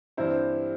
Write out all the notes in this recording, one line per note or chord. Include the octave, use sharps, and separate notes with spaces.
G2 E3 C4 E4 C5